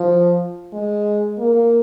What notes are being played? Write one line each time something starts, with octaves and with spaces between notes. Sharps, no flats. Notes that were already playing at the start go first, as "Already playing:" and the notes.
Already playing: F3
G#3
A#3